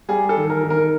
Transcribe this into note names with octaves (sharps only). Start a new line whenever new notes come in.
G3 G#4
A4
D#3
A#4
D#3
A#4